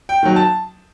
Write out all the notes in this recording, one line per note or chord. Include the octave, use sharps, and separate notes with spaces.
G5
D#3 F#3
A5